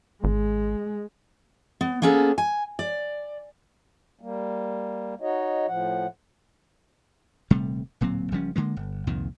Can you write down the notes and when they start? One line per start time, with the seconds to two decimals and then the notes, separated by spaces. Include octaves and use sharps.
0.24 G#1 G#3
1.81 B3
2.02 A#3 B3 C#4 G#4 A4
2.38 G#5
2.79 D5
4.21 G3 A#3
5.21 D#4 F#4 C#5 D#5
5.67 A2 F3 F#5
7.50 D#1 C3 G3 A3
8.01 D1 A#2 F#3 C4
8.32 F#1 F3 G3 C#4
8.56 D3 G#3 A#3
8.77 G1
9.07 C2 F2 A#2 D#3